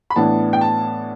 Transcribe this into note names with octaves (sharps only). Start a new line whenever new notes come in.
B5
A2 E3 B3 D4 A5
G5
A5